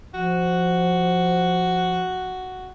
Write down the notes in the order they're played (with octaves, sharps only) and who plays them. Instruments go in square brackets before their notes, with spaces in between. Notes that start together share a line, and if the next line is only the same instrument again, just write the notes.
[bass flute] F3 [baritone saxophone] F#4